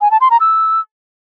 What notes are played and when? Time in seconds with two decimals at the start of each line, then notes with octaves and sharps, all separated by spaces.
0.01 G#5
0.11 A5
0.21 C6
0.30 A#5
0.40 E6